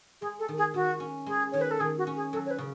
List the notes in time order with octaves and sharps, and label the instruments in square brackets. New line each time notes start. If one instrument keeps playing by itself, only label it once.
[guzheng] G#3 [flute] G#4
[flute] A4
[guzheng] D#3
[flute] G#4
[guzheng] D#3 [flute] F#4
[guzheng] C#4
[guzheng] G#3 [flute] G#4
[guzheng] D#3 [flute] C#5
[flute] B4
A4
[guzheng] D#3 [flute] G#4
[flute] F#4
[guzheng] C#4
[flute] G#4
[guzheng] F#3 [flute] A4
[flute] C#5
B4
[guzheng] C#3